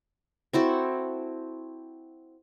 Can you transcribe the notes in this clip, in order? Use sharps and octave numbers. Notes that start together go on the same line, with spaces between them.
C4 E4 F#4 A4